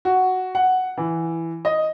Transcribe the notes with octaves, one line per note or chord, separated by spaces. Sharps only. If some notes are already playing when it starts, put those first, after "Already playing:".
F#4
F#5
E3
D#5